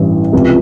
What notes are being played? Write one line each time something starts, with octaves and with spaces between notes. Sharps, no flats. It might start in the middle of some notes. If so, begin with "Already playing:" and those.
Already playing: A1 G2 E3
C#2 C3 F3